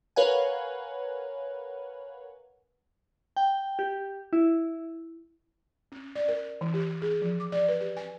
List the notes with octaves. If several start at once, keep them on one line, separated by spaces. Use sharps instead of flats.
A#4 B4 C#5 F5 F#5 G#5
G5
G4
E4
C#4
D5
A#4
E3
G4
G#4
F3
D6
D5
B4
G4
G#5